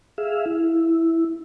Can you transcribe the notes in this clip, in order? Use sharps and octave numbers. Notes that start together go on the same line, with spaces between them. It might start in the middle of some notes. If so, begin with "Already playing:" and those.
G#4 E5 F5
E4